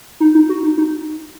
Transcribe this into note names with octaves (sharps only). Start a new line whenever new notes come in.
D#4
D#4
F#4
D#4
D#4